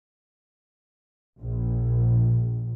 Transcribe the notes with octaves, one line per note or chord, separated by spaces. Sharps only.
A#1